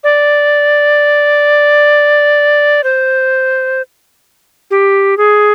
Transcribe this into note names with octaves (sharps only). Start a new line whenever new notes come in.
D5
C5
G4
G#4